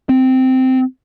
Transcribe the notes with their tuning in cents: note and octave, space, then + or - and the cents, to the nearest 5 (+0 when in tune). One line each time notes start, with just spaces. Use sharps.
C4 -10